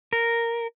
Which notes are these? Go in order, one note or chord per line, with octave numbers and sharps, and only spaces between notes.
A#4